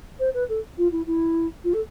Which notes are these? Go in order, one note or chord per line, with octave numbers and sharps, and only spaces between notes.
C5
B4
A4
F4
E4
E4
F4
A4